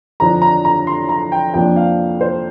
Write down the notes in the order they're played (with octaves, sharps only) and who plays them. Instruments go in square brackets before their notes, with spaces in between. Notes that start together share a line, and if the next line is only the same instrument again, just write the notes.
[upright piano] F2 D3 F3 D4 A#5
A#5
A#5
C6
A#5
G5
F2 F3 A#3 D4 G5
F5
C5